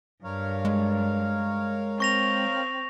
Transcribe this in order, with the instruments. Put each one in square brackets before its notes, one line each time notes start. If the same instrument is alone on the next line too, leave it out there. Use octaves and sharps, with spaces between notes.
[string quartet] G2 [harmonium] A#4 C#5 F5
[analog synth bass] G#3
[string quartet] C4 [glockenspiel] C#6 A#6 F7